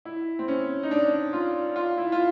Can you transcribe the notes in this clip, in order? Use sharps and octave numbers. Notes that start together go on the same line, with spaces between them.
E4
C4
C#4
D#4
D4
F4
F4
E4
F4